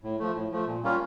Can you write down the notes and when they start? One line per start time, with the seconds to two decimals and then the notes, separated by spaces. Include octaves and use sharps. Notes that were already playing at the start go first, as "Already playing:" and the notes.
0.04 A2
0.19 F3 A3
0.36 A2
0.52 F3 A3
0.67 A#2
0.84 G3 A#3 C#4 F4